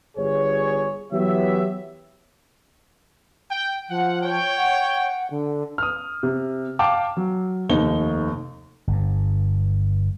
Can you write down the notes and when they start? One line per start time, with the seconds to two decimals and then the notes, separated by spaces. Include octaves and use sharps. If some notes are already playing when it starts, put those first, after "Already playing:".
0.17 G1 G#4 C#5
1.13 E3 F#3 B3 G4 C#5 E5
3.51 G5
3.89 F3 F#5
4.21 C#5 G5
4.58 F#5
4.95 F#5
5.31 D3
5.78 D#6 F6
6.23 C3
6.79 F5 G5 A5 D6
7.17 F#3
7.69 F1 D#2 D#4 G7
8.87 G1 G2